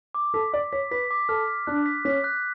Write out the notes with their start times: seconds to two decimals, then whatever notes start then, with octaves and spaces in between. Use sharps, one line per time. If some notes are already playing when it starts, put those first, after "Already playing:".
0.15 D6
0.34 A4 B6
0.52 D5 D6
0.73 C#5 B6
0.91 B4 B6
1.11 D6
1.29 A4 F6
1.48 B6
1.67 D4 F#6
1.86 B6
2.05 C#4 B6
2.24 F#6